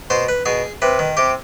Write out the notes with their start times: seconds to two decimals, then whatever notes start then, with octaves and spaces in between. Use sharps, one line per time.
0.10 B2 C5
0.28 B4
0.46 B2 G#4
0.82 C3 B4
0.99 D#3
1.17 C3 G4